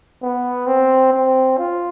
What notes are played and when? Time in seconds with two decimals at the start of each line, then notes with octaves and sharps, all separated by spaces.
0.22 B3
0.67 C4
1.13 C4
1.58 F4